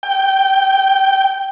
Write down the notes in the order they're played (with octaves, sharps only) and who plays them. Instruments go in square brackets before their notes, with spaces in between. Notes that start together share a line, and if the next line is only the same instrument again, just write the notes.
[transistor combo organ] G5